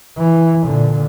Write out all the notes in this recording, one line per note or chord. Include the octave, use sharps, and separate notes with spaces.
E3
A#2 D3